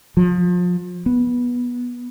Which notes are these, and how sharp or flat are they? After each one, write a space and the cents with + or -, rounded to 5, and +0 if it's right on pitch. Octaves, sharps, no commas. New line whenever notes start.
F3 +30
B3 -15